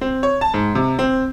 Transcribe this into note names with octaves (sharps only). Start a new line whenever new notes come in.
C4
C#5
A5
G#2
C3
C4